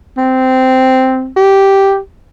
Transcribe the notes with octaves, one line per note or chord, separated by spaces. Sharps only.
C4
G4